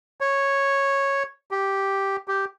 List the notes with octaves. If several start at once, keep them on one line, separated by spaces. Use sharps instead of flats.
C#5
G4
G4